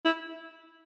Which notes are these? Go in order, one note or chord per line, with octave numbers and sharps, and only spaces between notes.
E4